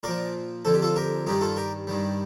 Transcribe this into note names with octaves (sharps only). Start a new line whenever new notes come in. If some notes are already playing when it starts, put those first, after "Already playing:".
A#2 F3 A#4 D5
F2 D3 F3 A4
G4
F4 A4
G4 A#4
G2 D#3 G3 D#4 G4
F4 A4
G4 A#4
G2 D#3 G3